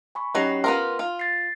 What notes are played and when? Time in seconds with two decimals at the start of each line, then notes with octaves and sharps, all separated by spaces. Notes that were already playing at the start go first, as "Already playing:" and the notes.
0.15 G#5 B5 C#6
0.35 F#3 C#4 D#4 G4 C7
0.64 B3 F4 A#4 C6 F6
0.99 F4
1.19 A6 C7